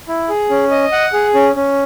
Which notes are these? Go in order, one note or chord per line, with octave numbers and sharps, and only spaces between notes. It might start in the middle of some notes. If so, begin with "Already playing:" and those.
E4
G#4
C#4
D#5
F#5
G#4
C#4
C#4